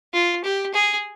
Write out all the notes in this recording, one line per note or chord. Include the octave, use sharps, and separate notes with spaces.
F4
G4
G#4